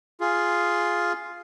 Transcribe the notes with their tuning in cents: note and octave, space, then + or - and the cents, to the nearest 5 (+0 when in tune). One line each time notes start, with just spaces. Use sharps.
F4 +0 G#4 +0